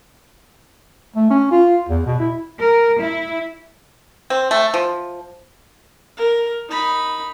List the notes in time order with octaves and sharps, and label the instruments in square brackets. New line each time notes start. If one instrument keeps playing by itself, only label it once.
[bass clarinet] A3
C#4
F4
E2
B2
E4
[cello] A#4
E4
[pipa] C4
A3
F3
[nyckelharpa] A#4
D#4 B5